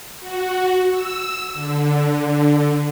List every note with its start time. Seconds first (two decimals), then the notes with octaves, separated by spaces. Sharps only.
0.20 F#4
0.90 E6
1.54 D3